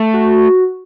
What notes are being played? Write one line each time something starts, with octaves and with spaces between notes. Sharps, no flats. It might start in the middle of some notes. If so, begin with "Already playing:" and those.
Already playing: A3
F#4